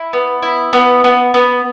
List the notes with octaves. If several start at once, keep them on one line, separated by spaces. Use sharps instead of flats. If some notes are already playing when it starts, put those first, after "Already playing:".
Already playing: E4
B3
E4
B3
B3
B3